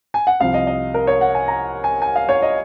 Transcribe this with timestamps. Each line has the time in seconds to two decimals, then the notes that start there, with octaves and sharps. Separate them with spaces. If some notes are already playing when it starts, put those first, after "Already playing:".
0.14 G#5
0.27 F#5
0.40 C2 C3 F3 F5
0.54 D#5
0.67 D#5
0.94 A#4
1.07 C#5
1.21 F#5
1.35 G#5
1.48 A#5
1.84 G#5
2.02 G#5
2.16 F5
2.29 C#5
2.42 D#5